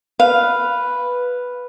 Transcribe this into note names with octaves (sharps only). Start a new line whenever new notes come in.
B4 F5